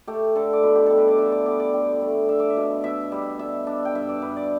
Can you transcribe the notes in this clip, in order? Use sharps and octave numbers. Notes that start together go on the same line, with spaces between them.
A3 G4
D3 A4
D5
B2 B4
G4
G3 A4
B4
D5
D3 E5
D5
B3 D5
D5
D3 G5
A3
D4 E5
D5
E5
B2
B2 E5
G3
B2 E5
D4
G5
G2 E5
D5
G2 B4
D5